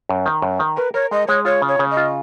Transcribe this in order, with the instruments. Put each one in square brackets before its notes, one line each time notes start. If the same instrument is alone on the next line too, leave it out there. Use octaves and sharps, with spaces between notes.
[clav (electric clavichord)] F#2
D#3
F#2
D#3
[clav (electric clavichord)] A#4 [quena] B4
[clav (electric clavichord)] A#4 [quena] C#5
[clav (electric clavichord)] G#3 [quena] D#5
[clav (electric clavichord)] G#3 [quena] C#5
[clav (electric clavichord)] F4 [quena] C#5
[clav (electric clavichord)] C#3
[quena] C#5
[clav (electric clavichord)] C#3
[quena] D#5
[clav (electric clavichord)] F4